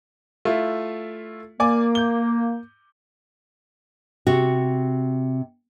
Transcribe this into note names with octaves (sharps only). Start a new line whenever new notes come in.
A3 E4 F4
A#3 D5 G#5 D6
G6 G7
C3 F#4